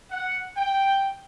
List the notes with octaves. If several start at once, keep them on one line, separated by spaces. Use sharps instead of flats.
F#5
G5